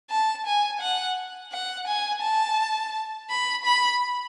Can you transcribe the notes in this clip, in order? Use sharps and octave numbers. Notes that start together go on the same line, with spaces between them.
A5
G#5
F#5
F#5
G#5
A5
B5
B5